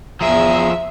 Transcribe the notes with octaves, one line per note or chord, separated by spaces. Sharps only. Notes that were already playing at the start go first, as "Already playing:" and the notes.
E2 F3 G#4 E5 A#5